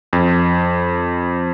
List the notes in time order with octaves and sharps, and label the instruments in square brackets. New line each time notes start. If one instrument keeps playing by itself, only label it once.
[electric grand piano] F2